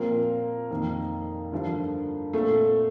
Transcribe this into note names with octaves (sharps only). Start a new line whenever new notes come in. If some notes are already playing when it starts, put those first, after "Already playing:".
Already playing: A#2 F3 A#3 C4 A#4
F2 D#3 A#3
G2 D3 F3
A#2 A3 C4 A4